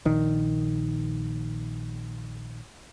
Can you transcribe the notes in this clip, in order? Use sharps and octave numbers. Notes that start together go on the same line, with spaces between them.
A#1 D#3